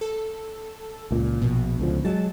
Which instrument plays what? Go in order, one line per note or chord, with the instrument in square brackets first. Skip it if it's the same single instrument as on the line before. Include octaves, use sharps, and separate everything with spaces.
[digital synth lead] A4
[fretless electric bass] C#2 A#2
[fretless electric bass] A#1 [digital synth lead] B2
[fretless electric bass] C#2 D3 F3
[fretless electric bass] F#3 G#3 [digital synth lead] A5